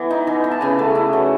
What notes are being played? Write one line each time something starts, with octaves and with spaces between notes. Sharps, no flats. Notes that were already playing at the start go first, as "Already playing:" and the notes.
Already playing: E3 B3
D#4
E3
B3
A5
C#3 G#5
A3
E4
F#3